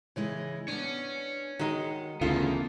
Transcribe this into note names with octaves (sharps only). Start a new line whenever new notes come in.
C#3 E3 G#3
B3 D4 C#5 G#5
D#3 G#3 F#4 D#5
D2 C#3 E3 A#3 B3 F4 A4